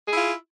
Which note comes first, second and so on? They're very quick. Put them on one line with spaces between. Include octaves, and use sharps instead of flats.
G#4 E4 F4